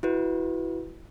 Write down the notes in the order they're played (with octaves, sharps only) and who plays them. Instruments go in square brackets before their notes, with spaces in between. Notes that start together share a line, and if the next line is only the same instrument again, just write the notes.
[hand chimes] E4 F#4 B4